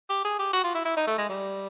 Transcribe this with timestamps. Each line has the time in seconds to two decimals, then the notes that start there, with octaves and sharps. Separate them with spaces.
0.10 G4
0.25 G#4
0.39 G4
0.53 F#4
0.64 F4
0.75 E4
0.85 E4
0.97 D#4
1.07 A3
1.18 G#3
1.29 G3